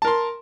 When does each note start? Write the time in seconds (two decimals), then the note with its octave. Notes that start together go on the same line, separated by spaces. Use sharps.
0.02 A5
0.05 A#4
0.07 C6